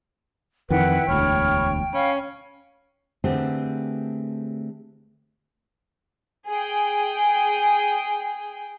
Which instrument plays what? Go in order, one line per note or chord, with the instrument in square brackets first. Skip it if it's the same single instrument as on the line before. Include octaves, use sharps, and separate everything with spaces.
[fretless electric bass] F2 D#3 E3 [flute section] E4 B4 F#5 [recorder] G5
[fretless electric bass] E1 D2 [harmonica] C#5 [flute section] B5 F6
[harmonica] C#4 [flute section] F5 B5
[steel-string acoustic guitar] D3 A3 C4 G4 G#4 B4
[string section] G#4 G5